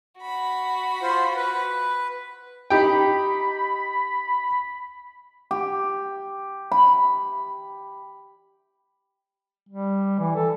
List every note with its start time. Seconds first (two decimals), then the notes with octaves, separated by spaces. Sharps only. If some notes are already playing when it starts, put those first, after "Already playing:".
0.20 F#4 B5
1.02 F4 C5
1.36 B4
2.70 D#4 G4 G5 B5
5.51 G4
6.72 B5
9.69 G3
10.19 E3
10.36 A4